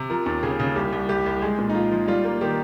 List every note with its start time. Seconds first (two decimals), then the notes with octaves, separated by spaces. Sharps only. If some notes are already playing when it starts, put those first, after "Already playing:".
Already playing: C3
0.10 F3 A#4
0.26 D#2
0.43 C#3 G#4
0.60 C#3
0.76 C2 G4
0.92 C2
1.09 C2 G4
1.26 C2
1.42 G#3 G#4
1.58 A#2
1.69 D#4
1.75 F3 F4
1.92 F3
2.08 G3 F4
2.24 A#3
2.41 D#3 G4